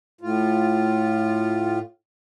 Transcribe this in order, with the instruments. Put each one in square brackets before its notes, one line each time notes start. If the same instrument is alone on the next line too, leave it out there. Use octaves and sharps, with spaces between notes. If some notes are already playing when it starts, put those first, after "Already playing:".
[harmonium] A2 F4